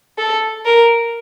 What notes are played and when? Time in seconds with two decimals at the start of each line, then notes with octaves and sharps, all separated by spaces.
0.18 A4
0.65 A#4